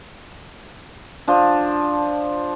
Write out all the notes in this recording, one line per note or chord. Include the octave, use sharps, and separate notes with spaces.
F3 D4